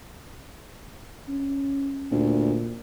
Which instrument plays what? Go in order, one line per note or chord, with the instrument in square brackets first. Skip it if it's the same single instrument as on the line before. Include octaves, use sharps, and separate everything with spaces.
[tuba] C#4
[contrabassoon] D2 [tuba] A#2